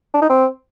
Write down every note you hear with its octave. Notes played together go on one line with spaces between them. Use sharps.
D4
D#4
C4